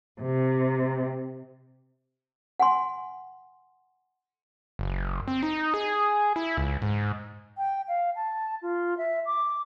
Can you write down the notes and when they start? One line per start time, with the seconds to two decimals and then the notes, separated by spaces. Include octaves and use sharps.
0.21 C3
2.60 F#5 G#5 C6
4.79 F#1
5.28 C4
5.43 D#4
5.74 G#4
6.36 E4
6.57 C#2
6.82 G#2
7.57 G5
7.88 F5
8.16 A5
8.62 F4
8.98 E5
9.26 D6